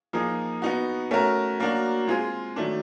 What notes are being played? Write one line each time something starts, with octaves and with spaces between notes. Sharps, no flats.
F3 A#3 D#4 G#4
B3 D#4 F#4
A3 C#4 F#4 A#4
F#3 A#3 D4 F#4
G#3 C4 F4 G#4
D#3 F#3 A3 D4